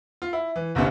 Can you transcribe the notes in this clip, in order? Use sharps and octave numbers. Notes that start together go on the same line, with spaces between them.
F4
E4
E3
G1 C2 C3 C#4 D4